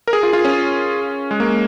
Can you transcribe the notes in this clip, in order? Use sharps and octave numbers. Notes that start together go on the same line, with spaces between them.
A#4
G#4
F4
F4
C#4
G#3
A#3